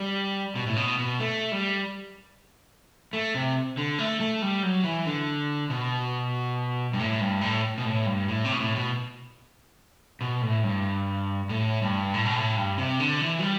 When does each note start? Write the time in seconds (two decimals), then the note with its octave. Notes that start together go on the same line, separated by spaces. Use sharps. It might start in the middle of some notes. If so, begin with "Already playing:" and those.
Already playing: G3
0.56 B2
0.66 A2
0.76 B2
0.98 B2
1.19 A3
1.52 G3
3.13 A3
3.35 C3
3.77 D3
3.99 A3
4.20 A3
4.42 G3
4.63 F#3
4.84 E3
5.06 D3
5.70 B2
6.93 G2
6.99 A2
7.21 G2
7.41 A2
7.78 B2
7.85 A2
8.06 G2
8.28 A2
8.45 C3
8.52 B2
8.60 A2
8.75 B2
10.21 B2
10.42 A2
10.63 G2
11.49 A2
11.82 G2
12.14 A2
12.25 B2
12.35 A2
12.57 G2
12.78 C3
13.00 D3
13.21 E3
13.39 F#3
13.42 G3